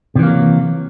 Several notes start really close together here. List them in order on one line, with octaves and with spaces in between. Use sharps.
C3 E3 A#3 F#3